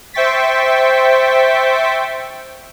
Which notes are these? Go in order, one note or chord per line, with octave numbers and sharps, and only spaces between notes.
C5 E5 G5 C#6 A6 B6